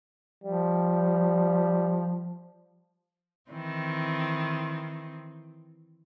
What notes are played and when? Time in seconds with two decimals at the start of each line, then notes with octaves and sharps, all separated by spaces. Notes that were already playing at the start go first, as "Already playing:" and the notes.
0.44 F3 G3
3.51 D#3 E3 C4